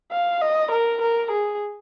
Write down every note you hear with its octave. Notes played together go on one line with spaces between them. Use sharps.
F5
D#5
A#4
A#4
G#4